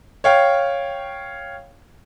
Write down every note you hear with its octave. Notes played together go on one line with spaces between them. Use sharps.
C#5 F5 G5